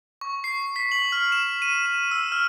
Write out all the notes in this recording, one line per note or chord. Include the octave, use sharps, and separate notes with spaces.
C#6
C7
B6
F#7
F6
E7
D#7
E7
E6
F6